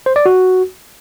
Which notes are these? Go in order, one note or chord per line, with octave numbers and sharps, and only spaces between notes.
C5
D5
F#4